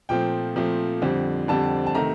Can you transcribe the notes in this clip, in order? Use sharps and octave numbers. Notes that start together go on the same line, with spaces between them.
A#2 F3 A3 C4 G5
A#2 F3 A3 C4
F2 D3 G3 C4
F2 D3 G3 C4 A5
A5
C3 D#3 A3 A#5